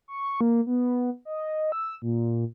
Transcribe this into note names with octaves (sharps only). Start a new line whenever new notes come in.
C#6
A#3
B3
D#5
E6
A#2